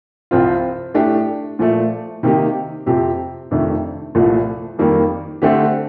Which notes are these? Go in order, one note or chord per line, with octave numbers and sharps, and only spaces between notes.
C2 C3 F3 C4 F4
A2 A3 D4 G4
A#2 F3 A3
C3 D#3 A#3 D#4 G4
F2 C3 F3 C4 G4
F2 C3 D#3 A3 D4
C2 A#2 F3 A3
F2 D#3 G3 A#3
D3 A3 C4 G4